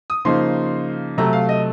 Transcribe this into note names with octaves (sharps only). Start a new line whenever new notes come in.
D#6
C#3 F3 A#3 D#4 C6
C3 F#3 A3 A#5
F5
D#5